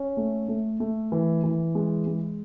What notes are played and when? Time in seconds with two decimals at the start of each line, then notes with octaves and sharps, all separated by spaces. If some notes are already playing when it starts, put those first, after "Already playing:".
Already playing: C#4
0.17 A3
0.49 A3
0.80 A3
1.12 E3
1.44 E3
1.75 G#3
2.07 G#3